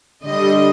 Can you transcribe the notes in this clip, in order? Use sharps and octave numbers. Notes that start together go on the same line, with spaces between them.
D3 G3 D#5